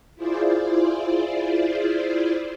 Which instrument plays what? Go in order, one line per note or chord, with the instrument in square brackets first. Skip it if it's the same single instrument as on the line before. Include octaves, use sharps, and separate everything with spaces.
[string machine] E4 F4 G#4 C5 D5